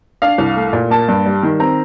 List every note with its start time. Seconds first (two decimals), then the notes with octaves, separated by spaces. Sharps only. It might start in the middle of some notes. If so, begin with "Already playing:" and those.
0.22 D4 F5
0.38 C2
0.56 A3
0.73 A#2
0.90 A#3 A5
1.08 G2
1.26 G3
1.43 D#3
1.60 C4 A#5